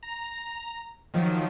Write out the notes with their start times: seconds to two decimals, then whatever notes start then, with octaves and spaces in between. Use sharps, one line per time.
0.03 A#5
1.14 D#3 F3 F#3